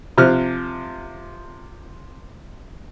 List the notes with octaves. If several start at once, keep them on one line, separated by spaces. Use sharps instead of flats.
C3 F3 F6 F#6